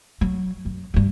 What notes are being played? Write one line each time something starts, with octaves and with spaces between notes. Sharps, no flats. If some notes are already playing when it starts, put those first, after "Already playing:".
F#3
F#2
G2 D3